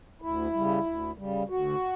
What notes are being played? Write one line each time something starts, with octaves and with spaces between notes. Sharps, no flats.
D2 E4
C#3 G3
D2
C#3 G3
D2 F#4